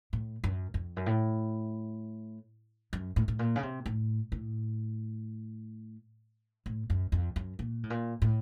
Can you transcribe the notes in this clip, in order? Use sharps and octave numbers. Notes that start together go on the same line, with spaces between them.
A2
F#2
F2
F#2
A2
F#2
A2
A2
A#2
C#3
C3
A2
A2
A2
F#2
F2
F#2
A#2
A2
A#2
A2